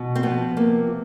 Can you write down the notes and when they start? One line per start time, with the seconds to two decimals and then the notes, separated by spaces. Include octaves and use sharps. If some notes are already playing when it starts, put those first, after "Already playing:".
Already playing: B2
0.15 C4
0.23 F3 B3
0.56 C3 A#3